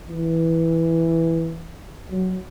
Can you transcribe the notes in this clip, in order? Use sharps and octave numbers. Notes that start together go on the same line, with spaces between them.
E3
F#3